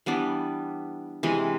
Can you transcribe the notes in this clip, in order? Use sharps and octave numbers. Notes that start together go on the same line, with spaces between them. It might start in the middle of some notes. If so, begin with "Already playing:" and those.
E3 G3 B3 D4
C3 E3 G#3